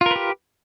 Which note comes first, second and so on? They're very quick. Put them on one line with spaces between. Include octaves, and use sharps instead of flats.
F4 A#4 B4 G4